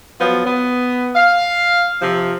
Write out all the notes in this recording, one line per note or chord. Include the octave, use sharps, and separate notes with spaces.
F3 F#3 B3
B3
F5
C3 F3